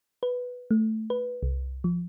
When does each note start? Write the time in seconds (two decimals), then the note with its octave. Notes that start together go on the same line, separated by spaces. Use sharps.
0.23 B4
0.71 A3
1.10 B4
1.43 C2
1.84 F3